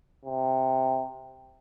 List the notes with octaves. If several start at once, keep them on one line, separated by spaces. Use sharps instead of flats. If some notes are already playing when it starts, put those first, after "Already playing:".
C3